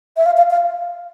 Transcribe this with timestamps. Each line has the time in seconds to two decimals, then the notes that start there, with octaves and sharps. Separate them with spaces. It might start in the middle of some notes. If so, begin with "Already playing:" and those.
0.17 E5
0.26 F5
0.37 F5
0.50 F5